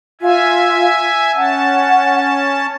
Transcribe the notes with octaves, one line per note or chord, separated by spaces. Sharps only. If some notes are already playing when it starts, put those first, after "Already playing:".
F4 E5 G#5
C#4 F#5 A5